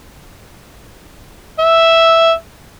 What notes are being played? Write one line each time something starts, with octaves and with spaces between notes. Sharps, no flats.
E5